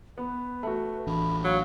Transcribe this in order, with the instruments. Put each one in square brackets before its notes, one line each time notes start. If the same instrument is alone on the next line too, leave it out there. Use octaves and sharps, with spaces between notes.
[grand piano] B3 [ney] B4
[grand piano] A3 F#4
[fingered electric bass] A1 E3 D4 [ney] B5
[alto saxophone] F#3 [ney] F5